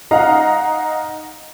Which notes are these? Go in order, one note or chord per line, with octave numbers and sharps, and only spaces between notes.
D#4 D#5 F5 F#5 A#5